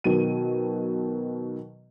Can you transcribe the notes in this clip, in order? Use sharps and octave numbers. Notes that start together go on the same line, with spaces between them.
B2 D#3 F#3 D#7